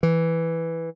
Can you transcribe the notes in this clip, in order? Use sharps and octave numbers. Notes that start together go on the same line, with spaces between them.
E3